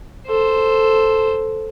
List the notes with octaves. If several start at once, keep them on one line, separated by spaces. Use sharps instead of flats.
A4 C5